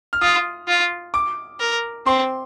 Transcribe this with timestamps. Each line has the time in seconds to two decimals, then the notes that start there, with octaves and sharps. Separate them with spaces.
0.13 F6
0.21 F4 D#6
0.68 F4
1.14 D6
1.60 A#4
2.06 C4 C6